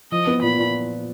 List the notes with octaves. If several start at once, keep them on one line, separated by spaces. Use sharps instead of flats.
F3 D#5
B3
A#2 B5
A#2